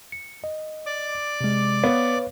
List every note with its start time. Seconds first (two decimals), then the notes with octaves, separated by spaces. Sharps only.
0.12 C#7
0.44 D#5
0.86 D5 D6
1.41 C3 G#3
1.84 B3 B4 C#5 F5